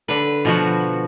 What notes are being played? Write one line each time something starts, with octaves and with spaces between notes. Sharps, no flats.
D3 B4
B2 F3 F#4